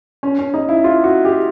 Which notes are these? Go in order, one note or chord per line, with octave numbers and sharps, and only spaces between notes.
C#4
C#4
D#4
E4
F4
F#4
G4